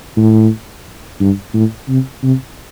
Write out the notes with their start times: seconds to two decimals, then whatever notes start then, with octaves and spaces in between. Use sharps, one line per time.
0.17 A2
1.20 G2
1.54 A2
1.89 C3
2.23 C3